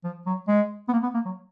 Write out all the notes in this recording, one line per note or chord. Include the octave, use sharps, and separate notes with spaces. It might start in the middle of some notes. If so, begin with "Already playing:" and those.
F3
F#3
G#3
B3
A#3
B3
A#3
F#3